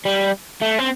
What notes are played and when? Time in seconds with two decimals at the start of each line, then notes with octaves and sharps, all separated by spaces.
0.05 G3
0.62 A3
0.79 C4